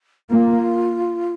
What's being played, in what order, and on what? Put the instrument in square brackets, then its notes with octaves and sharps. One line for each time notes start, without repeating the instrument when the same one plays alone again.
[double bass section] A#3 [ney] F4